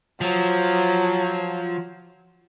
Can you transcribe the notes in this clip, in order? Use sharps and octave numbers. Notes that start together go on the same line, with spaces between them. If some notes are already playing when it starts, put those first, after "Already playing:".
F3 F#3